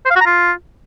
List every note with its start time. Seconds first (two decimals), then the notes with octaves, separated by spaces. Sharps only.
0.05 C5
0.10 F5
0.16 F#4
0.21 A#5
0.26 F4